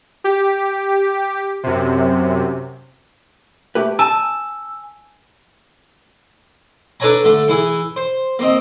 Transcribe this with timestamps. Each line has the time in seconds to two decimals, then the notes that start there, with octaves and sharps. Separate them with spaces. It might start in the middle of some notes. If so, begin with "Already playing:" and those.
0.24 G4
1.63 F#2 C3
3.75 A3 G4 B4
3.99 G#5 A5 E6
7.00 D4 A4 B4 C#5 G#5 A#5
7.24 D3 A3
7.48 E3 E4 G#4
7.96 C5
8.39 A#3 C4 D#5